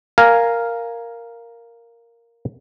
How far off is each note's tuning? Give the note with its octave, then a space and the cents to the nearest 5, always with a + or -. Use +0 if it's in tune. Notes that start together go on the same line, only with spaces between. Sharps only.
A#4 +0 F5 +0 G#5 +0